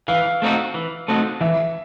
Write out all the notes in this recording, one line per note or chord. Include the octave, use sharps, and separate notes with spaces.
E3 F5
A3 C4 D#4 F#4
E3
A3 C4 D#4 F#4
E3 E5